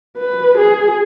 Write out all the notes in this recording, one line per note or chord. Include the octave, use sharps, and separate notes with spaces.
B4
G#4